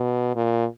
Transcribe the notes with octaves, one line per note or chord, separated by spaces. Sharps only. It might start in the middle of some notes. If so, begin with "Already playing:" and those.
Already playing: B2
A#2